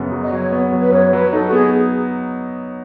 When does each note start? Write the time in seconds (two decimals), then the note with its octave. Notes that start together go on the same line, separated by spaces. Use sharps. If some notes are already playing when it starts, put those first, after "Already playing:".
Already playing: F#2 C#3 B3
0.12 F#3
0.23 D#5
0.31 F#3 C#5
0.52 B3
0.73 F#3
0.81 B4
0.92 F#2 C#5
1.13 F#3 B4
1.33 D#4 A4
1.46 F#4
1.53 B3 G#4